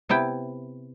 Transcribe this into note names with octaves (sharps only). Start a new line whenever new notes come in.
C3 B3 E4 G5